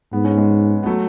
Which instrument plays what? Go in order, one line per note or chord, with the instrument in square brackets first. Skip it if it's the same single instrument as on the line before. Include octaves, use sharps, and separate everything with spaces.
[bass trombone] G#2 [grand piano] B3
[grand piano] C#4
G#3 B3
B3
F#3 A3